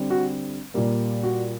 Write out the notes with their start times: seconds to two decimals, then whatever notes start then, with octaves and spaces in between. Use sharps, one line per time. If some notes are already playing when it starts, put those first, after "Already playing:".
Already playing: D3 G3 C4
0.10 F#4
0.74 A#2 G3 A#3
1.23 F#4